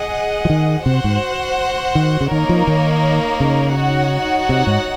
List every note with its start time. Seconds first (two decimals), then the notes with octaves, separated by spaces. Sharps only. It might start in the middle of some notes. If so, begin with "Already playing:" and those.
Already playing: G#4 D#5 F#5
0.45 F3
0.50 D#3
0.86 C3 F#4 C5 F#5
1.04 G#2
1.95 D#3
2.21 C#3
2.31 D#3 A#3 D#4 A#4 C#5
2.49 F3
2.67 D#3
3.40 C#3
3.76 D#4 F#4 C#5 F#5
4.49 C3
4.67 G#2